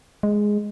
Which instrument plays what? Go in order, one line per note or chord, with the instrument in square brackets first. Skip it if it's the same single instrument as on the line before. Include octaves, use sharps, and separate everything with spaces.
[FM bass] G#3